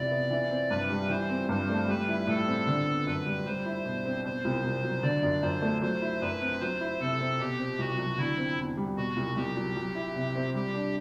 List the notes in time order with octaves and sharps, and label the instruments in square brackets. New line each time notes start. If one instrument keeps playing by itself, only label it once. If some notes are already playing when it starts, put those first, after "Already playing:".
Already playing: [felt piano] C3 E3 C4 E4 [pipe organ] D5
[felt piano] B3
E3
C4
[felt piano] G2 [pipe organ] B4
[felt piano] G3
[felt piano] E3 [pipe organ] C5
[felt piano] C4
[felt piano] G2 [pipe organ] C5
[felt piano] A3
[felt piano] G3 [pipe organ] B4
[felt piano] E4
[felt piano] A2 [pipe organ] A4
[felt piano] C4
D3
B3
[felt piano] F#2 [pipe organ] B4
[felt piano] G3
[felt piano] G3 [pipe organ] C5
[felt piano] E4
B2
C4
[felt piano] B2 [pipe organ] C5
[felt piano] C2
C2
F#3
[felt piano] D3 [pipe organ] D5
[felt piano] F#2
[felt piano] F#2 [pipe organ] C5
[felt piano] A3
[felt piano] F#3 [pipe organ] C5
[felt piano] E4
[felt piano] F#2 [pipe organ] B4
[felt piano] C4
[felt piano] F#3 [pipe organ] C5
[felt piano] E4
[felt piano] C3 [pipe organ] A4
[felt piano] C4
[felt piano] B2 [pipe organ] G4
[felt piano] C4
[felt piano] C2 [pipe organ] F#4
[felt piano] F#3
[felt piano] D3 [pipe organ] E4
[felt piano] C4
E2
G3
[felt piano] B2 [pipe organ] F#4
[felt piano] C2
[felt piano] C2 [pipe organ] G4
[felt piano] F#3
F#3
E4
C3
C4
[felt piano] G3 [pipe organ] G4
[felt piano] D4